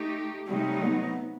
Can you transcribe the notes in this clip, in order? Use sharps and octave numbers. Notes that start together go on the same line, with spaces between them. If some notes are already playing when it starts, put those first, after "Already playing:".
Already playing: A3 D#4 G4
C3 F#3 G3 A3 D#4
B3